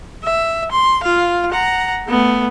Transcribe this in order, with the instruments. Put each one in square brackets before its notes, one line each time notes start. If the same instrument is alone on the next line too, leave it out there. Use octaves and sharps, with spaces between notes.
[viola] E5
C6
F4 F5
F#5 A#5
A3 B3